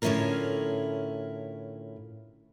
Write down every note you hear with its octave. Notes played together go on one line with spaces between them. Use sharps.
A2 D3 C#4 E4 F4 A#4